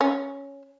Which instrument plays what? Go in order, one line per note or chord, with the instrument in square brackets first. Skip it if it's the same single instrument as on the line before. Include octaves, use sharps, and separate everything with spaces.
[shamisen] C#4